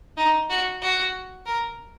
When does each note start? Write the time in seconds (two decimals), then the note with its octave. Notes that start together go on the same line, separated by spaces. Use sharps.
0.17 D#4
0.50 F#4
0.82 F#4
1.46 A#4